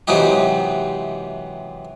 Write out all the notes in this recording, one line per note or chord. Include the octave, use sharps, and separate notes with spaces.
C3 E3 F#3 G#3 D#4 G4